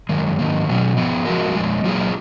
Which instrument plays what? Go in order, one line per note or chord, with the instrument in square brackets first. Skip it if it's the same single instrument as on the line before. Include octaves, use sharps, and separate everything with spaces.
[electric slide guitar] F#2 D#3 G#3
G#2 D#3 A#3
B2 F#3 C#4
F3 B3 F4
F3 G#3 C#4 F#4 A#4
F2 C#3 G#3
F#3 A#3 F4 G#4